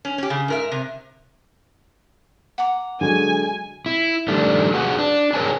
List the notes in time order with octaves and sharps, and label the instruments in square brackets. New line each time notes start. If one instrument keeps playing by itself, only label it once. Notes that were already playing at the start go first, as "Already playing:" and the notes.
[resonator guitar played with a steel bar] C#4
C#4 G4
C#3
G#2 A#4 E5
C3
[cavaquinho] F#5 A#5 D6
[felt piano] D3 F#3 G#3 [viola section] G#5
[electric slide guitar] E4
D#3 G3 A3 D4
F#4 G#4 B4 F#5
D4
G#4 A#4 C5 C#5 G#5 A5